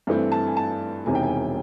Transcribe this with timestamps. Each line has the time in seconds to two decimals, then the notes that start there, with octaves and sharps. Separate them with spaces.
0.07 G2 E3 A3 C4
0.32 A5
0.47 G#5
0.57 A5
1.06 E1 E2 C3 D#3 G#5
1.15 G5
1.23 G#5